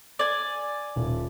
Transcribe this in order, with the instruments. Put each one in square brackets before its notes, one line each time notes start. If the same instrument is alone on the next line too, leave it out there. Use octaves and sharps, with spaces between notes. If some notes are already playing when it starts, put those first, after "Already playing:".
[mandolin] D5 G#5
[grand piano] D#1